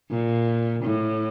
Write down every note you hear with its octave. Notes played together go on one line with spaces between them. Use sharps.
A#2
A2